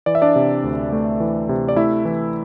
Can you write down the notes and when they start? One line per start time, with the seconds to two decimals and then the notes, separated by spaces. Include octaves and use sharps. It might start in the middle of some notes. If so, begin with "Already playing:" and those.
0.06 E3 D5
0.15 E5
0.22 D4 D5
0.36 C3
0.64 D2
0.93 A3
1.20 E3
1.49 C3
1.69 D5
1.76 A3 E4 E5
2.05 E3